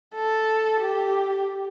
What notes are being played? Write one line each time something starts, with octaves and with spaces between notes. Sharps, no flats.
A4
G4